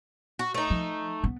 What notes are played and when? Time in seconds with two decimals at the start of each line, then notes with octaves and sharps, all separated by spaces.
0.39 F#4
0.54 A3 D#4
0.70 F3
1.24 B3